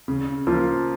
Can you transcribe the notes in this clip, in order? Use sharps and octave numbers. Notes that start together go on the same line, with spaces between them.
C#3
F3 A#3 F4